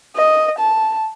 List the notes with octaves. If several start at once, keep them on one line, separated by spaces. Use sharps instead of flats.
D#5
A5